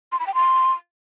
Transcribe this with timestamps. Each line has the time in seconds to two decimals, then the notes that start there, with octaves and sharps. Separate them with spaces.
0.12 C6
0.20 B5
0.27 G5
0.34 C6